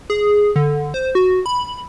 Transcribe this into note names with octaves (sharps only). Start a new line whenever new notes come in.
G#4
D3
C5
F#4
B5